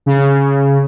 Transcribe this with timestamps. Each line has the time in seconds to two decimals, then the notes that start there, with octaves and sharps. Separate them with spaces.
0.06 C#3